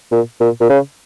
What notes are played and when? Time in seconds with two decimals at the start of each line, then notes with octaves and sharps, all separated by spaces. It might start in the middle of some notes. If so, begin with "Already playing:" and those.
0.11 A#2
0.40 A#2
0.61 A#2
0.70 C#3